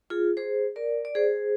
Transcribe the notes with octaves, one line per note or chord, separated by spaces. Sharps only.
F4 G#4
G#4 C5
A#4 D5
D5
G#4 C5